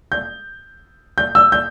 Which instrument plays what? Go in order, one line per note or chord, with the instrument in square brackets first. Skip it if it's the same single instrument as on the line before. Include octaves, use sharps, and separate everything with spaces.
[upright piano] G6
G6
E6
G6